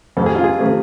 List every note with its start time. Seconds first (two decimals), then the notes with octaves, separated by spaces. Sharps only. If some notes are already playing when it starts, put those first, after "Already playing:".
0.17 F2 C3 F3 A3 A4
0.26 G#4
0.35 F4
0.44 G#4
0.59 C3 F3 A3